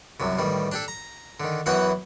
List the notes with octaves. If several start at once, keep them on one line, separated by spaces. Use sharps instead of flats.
C2 F#2 C3
A1 D#3 G3
D4 G4 A4
A#5
D3 D#3
F#2 E3 B3 F#4 F#5 G5